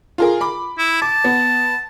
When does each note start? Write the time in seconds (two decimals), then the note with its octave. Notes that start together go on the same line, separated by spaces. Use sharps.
0.18 F4 G#4 A#4
0.41 B5 D6
0.78 E4
1.02 A5 D6
1.24 B3